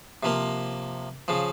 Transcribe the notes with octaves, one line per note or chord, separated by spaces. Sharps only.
C3 F3 A#3
C#3 F3